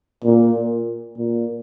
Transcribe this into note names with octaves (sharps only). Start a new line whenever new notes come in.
A#2
A#2